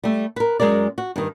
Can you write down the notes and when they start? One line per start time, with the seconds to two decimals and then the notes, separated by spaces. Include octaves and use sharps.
0.04 G3 A3
0.36 A#4 B4
0.60 F#2 G#3 G#4 A#4 D5
0.98 F#4
1.16 G2 D#3